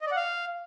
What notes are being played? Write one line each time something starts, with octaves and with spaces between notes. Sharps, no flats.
D#5
D5
F#5
F5